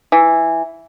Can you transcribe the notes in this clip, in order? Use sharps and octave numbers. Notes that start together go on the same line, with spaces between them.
E3